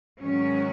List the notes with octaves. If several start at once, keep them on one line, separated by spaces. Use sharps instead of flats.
G#2 D#3 F#3 C#4